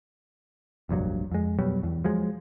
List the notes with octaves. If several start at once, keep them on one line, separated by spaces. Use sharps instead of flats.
F1 A#1 G2 F#3
F2 G#3
F2 B2 F#3 G3
E2
F3 F#3 G#3